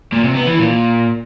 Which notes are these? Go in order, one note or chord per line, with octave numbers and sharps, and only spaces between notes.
A#2
C3
B3
E3
A#2